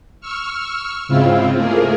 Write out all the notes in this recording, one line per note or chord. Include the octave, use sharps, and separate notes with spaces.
C#6 E6 F6
G#2 C#3 G#3 C4 E4 F4
A3 A#3 G#4 A#4